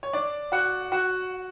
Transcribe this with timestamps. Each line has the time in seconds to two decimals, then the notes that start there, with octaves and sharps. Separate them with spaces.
0.03 C#5
0.13 D4 D5
0.52 F#4 F#5
0.92 F#4 F#5